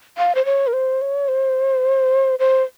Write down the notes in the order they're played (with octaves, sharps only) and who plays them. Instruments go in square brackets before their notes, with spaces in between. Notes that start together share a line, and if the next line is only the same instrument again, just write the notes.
[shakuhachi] F5
C5
C#5
A#4
C5
C#5
C5
C5